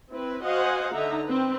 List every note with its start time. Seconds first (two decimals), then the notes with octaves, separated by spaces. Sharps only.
0.10 C4 E4 B4
0.43 F#4 C5 D#5 F5 F#5 G#5
0.92 D3 D#4 E5 A#5
1.25 C4 B4